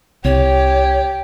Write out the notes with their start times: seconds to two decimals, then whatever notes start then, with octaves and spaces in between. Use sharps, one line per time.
0.24 C2 G4 C#5